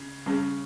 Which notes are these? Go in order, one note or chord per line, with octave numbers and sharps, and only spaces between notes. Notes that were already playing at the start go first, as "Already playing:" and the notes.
Already playing: C#3
C#3 G3 C#4 G#4